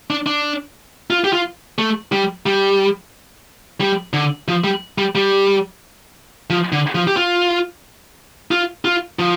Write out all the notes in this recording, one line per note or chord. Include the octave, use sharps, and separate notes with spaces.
D4
D4
F4
G4
F4
A3
G3
G3
G3
D3
F3
G3
G3
G3
F3
D3
F3
G4
F4
F4
F4
F3